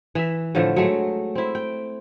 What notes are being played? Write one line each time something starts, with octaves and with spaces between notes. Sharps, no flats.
E3 E5
A2 D3 F3 A3
F#3 G#3 A3
C4 E4
G5